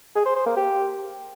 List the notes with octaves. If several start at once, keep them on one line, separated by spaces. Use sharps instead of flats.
G#4
C5
C5
A#3
G4